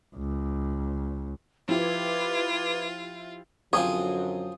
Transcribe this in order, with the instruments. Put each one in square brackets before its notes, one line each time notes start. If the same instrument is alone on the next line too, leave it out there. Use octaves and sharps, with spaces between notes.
[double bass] C#2
[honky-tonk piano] F3 E4 G4 [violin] F4 [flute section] B4 D6 G#6
[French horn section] F#2 D3 F#3 [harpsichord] F3 C4 G#4 [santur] D#6